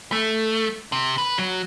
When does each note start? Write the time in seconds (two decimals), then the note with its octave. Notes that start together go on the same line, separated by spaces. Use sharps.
0.12 A3
0.92 C3
1.18 B4
1.38 F#3